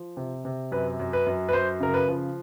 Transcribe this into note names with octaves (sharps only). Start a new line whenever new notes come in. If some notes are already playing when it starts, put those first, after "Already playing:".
Already playing: F3
C3
C3
F#2 B4
F#2
B4
F#2
B4
F#2 C5
C#3 A#4
B4
F3